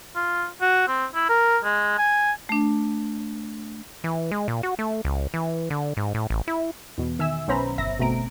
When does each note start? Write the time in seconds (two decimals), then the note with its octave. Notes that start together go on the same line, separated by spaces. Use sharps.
0.16 F4
0.61 F#4
0.88 C4
1.15 E4
1.29 A#4
1.64 G#3
1.98 G#5
2.49 A3 D4
4.04 E3
4.31 G#3
4.48 A#2
4.63 F#4
4.79 A3
5.05 C#2
5.34 E3
5.70 D3
5.97 G#2
6.14 A2
6.30 A1
6.48 E4
6.98 E2 B2
7.19 D#3 E5 G#5 E6
7.48 B1 B3 C#4 C5 A#5 B5
7.78 G1 E5 A#6
7.99 G1 B2 A3 C4 A#5 D7